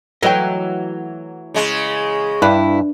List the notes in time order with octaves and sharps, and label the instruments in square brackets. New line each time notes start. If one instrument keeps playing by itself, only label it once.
[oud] E3 F#3 A3 [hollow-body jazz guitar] D#5 G5
[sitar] C#3 G#3
[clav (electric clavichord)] G2 [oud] D4 B4 [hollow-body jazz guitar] E4